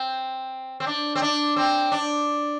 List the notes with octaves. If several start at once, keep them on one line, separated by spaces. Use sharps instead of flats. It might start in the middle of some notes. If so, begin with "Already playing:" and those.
Already playing: C4
C4
D4
C4
D4
C4
D4